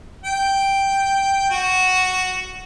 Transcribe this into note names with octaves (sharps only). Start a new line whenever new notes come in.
G5
F#4